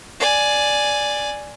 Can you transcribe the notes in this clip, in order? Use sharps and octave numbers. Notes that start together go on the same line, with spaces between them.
D5 G#5